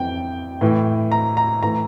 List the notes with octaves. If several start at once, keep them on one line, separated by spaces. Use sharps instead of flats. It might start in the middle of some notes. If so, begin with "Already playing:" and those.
Already playing: F2 E3 G5
A2 E3
A#5
A#5
A2 E3 A#5